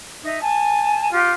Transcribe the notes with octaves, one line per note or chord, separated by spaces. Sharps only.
D#4 E5
G#5 A5
F4 G4